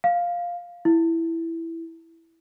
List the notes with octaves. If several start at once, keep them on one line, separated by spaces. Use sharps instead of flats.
F5
E4